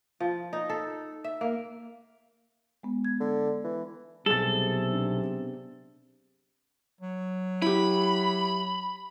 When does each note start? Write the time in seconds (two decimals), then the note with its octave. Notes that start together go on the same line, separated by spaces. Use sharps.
0.20 F3
0.53 D#4
0.69 A4
1.24 E5
1.41 A#3
2.83 G#3 B3
3.05 G#6
3.20 D3
3.64 E3
4.26 B1 C3 G3 G#4 A4 A6
4.93 B3 C4 D4
7.01 F#3
7.62 E4 G4 B5